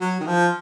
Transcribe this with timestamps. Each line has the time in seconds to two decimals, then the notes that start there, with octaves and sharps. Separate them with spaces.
0.01 F#3
0.20 D#3
0.27 F3